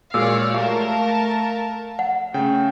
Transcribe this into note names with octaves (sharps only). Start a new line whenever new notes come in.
A#2 G#3 F#4 G#4 C#5 D5 F5 E6
A3 G4 A#4 F5 A5
F#5
C#3 A3 G5